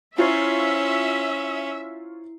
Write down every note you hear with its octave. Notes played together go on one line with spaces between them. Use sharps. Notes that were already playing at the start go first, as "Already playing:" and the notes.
C#4 E4 F4 C5 C#5 E5 C7